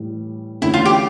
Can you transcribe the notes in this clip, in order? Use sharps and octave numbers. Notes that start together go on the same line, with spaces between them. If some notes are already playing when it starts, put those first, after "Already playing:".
Already playing: A2 E3 G3
E2 D3 A3 C#4 E4
F4
G4